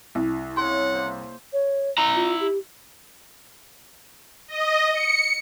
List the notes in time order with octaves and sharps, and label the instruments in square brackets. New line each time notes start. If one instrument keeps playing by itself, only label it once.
[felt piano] C2
[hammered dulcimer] C#3 C#4 [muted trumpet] F#5 [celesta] C6
[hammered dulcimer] A#3 C5
[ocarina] C#5
[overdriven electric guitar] E4 A#5
[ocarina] F4
G4
[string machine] D#5
C#7